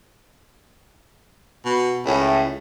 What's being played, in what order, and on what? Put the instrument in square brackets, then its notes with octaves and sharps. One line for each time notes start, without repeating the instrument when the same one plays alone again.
[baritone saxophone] B2
[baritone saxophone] C#2 [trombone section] A2